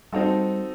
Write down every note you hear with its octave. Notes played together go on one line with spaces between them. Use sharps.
G3 C4 D#4 F#4 A4